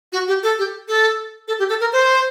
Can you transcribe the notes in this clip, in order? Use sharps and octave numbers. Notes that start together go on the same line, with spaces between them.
F#4
G4
A4
G4
A4
A4
G4
A4
A#4
C5